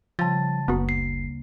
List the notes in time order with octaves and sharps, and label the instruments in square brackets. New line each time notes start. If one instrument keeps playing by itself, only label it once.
[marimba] C#3 G3 [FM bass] F3 [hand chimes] A5 A6
[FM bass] F#1 [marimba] D2 A#3 D#6 [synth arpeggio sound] B3 F#4
[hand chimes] C7